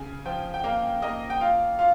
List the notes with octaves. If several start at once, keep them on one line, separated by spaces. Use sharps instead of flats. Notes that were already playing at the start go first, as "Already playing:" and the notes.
Already playing: C#3 G#5
F3 G5
G5
A#3 F5
A#3 D#5
G5
F4 F5
F4 F5